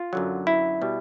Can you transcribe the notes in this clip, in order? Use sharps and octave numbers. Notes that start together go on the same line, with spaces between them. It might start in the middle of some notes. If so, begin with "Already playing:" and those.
Already playing: F4
F#2 D3 F#3
E4
B2 G3